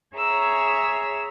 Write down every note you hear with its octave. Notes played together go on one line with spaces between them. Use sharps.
G#4 C#5 E5 G#5 A#5 E6